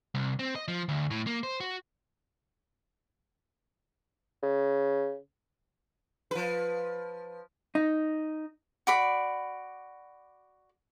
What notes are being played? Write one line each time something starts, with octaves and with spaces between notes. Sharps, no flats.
C2
C4
D#5
F3
D2
A2
A#3
C5
F#4
C#3
F3 B4
D#4
F#4 D5 B5